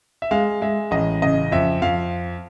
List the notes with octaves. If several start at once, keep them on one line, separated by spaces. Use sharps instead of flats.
E5
G#3 F5
G#3 E5
A1 D#5
C#3 D#5
F2 E5
F2 F5